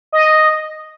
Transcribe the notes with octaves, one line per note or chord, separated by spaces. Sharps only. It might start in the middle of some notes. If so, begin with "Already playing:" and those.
D#5